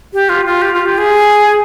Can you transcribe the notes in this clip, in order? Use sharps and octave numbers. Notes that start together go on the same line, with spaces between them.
G4
F4
F4
G4
F4
G4
G#4